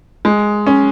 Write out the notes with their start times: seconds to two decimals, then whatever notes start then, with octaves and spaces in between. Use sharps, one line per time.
0.25 G#3
0.67 C#4